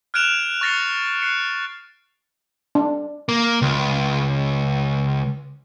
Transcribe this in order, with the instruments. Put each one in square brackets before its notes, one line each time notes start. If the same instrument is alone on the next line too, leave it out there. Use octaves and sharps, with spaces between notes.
[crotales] F6 F#6 G#6 D7 E7 F7
C#6 F6 A6 A#6 C7 C#7
F#6 C7 C#7
[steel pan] D4
[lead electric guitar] A#3
C#2